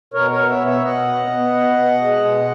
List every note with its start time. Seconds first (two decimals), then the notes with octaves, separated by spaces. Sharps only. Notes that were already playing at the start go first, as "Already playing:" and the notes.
0.14 B2 A#4 C#5
0.31 A#4 C#5
0.38 B3
0.49 C#5 E5
0.61 B2
0.66 C#5 E5
0.84 B2 D#5 F#5
1.08 B3
1.31 B3
1.55 B2
1.78 B2
2.01 G#3
2.25 B2